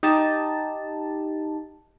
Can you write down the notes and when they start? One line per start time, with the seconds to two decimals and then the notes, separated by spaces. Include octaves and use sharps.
0.03 D#4 G4 A5